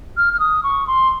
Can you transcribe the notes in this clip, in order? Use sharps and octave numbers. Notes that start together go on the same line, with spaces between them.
F6
F6
D#6
C#6
C6